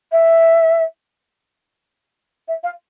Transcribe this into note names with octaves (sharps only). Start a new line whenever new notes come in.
E5
E5
F5